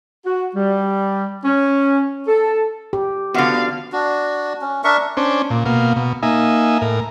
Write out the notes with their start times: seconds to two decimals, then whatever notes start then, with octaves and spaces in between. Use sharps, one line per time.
0.25 F#4
0.55 G3
1.44 C#4
2.28 A4
2.93 G4
3.34 D3 F3 B3 F#4 F5
3.92 D4 F#4
4.61 C#4
4.84 D4 A#4 E5 C#6
5.17 C#4 D4 C5
5.50 A#2
5.66 B2 A#3 F5
5.96 B2
6.23 A#3 D#4 E5 G#5
6.82 A2 A#4